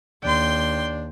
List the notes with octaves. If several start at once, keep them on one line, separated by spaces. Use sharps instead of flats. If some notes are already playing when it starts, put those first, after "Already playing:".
D#2 D4 G5 C6